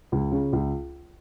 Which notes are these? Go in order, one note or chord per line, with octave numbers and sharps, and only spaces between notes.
C#2
C#3
C#2